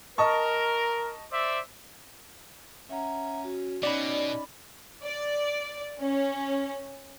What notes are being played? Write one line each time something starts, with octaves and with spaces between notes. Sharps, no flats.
A#4 D#5 A5 C#6
C5 D5 E5
C#4 E5 F#5 A#5
F#4
B2 C#4 D#4 D5 D#5 B5
D5
C#4